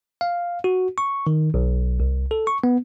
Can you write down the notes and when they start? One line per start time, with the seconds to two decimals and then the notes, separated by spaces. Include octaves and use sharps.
0.21 F5
0.64 F#4
0.98 C#6
1.27 D#3
1.54 B1
2.00 C2
2.31 A4
2.47 C#6
2.64 B3